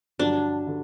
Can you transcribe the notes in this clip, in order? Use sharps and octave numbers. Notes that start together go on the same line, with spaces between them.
G2 D3 F#3 D4
D3